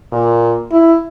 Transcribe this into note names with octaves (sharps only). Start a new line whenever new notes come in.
A#2
E4